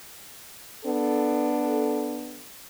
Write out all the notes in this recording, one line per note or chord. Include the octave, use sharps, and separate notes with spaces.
B3 D4 A4